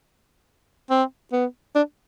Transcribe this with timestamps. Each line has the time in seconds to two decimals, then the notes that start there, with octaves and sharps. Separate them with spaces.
0.90 C4
1.32 B3
1.75 D4